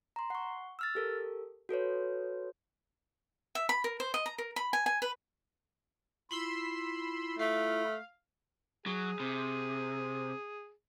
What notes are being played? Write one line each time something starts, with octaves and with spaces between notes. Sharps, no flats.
A#5 C6
F#5 C#6
E6 F6 A6
G4 A4 A#4
F#4 A4 B4 C#5
E5
B5
A#4
C5
D#5
A#5
A#4
B5
G#5
G#5
B4
E4 F4 B5 C6 E6
A3 F5
F#3 G#4
C3